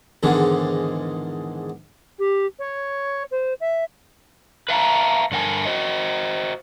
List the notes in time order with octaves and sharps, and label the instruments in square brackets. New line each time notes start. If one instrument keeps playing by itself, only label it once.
[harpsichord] E2 G#2 D3 D#3
[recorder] G4
C#5
C5
E5
[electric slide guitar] B4 E5 F5 A5 A#5
G2 D3 A#4 F#5 G#5 A5
F#4 C5 D#5